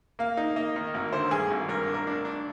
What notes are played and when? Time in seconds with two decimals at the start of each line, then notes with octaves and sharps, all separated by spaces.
0.19 A#3 F5
0.37 D#4
0.56 A#3 D#5
0.76 D#3
0.94 G#1 A#4
1.13 D3 C5
1.31 G2 G#4
1.51 G#1
1.68 G2 A#4
1.87 D4
1.94 A#4
2.07 D4
2.25 D4